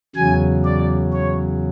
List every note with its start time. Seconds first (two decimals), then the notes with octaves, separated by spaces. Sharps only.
0.16 E2 C#3 F#3 G#5
0.65 D5
1.13 C#5